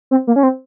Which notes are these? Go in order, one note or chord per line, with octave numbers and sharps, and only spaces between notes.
C4
A#3
C#4
C4